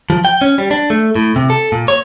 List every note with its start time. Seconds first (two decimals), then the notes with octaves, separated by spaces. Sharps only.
0.10 F3
0.25 G5
0.42 C#4
0.58 G3
0.71 D4
0.90 A3
1.16 A2
1.36 C3
1.50 A4
1.72 A#2
1.88 C#5